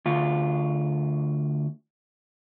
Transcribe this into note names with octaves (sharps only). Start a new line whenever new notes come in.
D2 F4